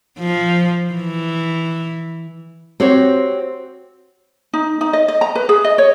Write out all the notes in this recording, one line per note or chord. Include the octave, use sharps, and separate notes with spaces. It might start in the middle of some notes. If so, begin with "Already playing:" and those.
F3
E3
C4 F#4 G4 C5 C#5
D#4
D#4
D#5
D#5
A#5
B4
G#4
D#5
C#5